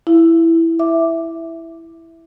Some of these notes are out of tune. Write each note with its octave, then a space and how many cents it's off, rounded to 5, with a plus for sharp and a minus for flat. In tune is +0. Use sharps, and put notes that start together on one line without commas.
E4 +0 F5 -40
E5 +0 D6 +5